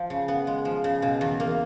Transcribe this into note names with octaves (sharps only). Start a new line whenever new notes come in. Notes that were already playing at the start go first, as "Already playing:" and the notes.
Already playing: F3
C#3
B3
G#3
F3
C#3
B2
E2
A#3